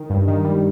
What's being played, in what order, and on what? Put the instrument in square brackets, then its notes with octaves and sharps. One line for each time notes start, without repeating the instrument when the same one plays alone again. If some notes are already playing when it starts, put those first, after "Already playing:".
Already playing: [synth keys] D#3
G2
D#3
G3